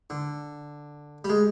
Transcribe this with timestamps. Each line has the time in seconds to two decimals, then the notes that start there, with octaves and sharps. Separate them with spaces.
0.10 D3
1.24 G3
1.29 G#3